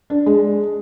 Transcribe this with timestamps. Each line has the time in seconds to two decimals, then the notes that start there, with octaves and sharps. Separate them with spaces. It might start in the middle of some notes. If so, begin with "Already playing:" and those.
0.10 D4
0.26 G#3